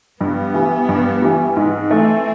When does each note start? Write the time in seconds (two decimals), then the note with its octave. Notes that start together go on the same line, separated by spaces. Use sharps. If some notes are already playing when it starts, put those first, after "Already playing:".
0.21 G2 B3
0.54 E3 G3
0.89 G2
1.22 E3 G3
1.57 G#2 C4
1.91 E3 A3